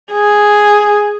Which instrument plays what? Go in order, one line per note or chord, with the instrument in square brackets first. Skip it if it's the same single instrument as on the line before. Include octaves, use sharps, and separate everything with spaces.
[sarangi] G#4